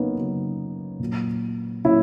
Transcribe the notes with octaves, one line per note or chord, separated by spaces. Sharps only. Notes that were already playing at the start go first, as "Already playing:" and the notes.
Already playing: C#3 F#3 A#3 B3 C#4 D#4
C#3 F#3
A#2 F#3
A#2 F#3 C#4 E4